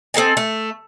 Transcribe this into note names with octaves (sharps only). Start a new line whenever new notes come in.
C4 A4 D#5 G#5
A3